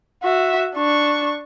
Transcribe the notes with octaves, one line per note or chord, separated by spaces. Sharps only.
F#4 E5
D4 C#6